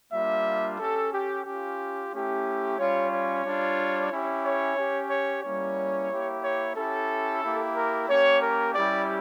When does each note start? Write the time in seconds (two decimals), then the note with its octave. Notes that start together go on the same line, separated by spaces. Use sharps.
0.13 G3 A#3 D4 F4 E5
0.79 C#4 G4 A4
1.13 G4
1.45 C#4 F4 G4
2.12 A3 C#4 E4 G4
2.78 G3 C#4 F4 C#5
3.11 C#5
3.45 G3 D4 F4
4.11 C#4 E4 G4
4.44 C#5
4.77 C#4 G4
5.10 C#5
5.43 G3 A#3 C#4 E4 C#5
6.11 A#3 E4 G4
6.43 C#5
6.77 C#4 E4 G4 A4
7.43 A#3 E4 G4
7.77 A#4
8.08 A#3 C#4 G4 C#5
8.42 A#4
8.75 G3 C#4 E4 G4 D5